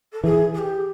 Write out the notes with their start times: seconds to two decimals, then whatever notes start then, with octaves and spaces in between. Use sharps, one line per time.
0.12 A4
0.23 E3 G#4
0.54 G#4
0.58 G4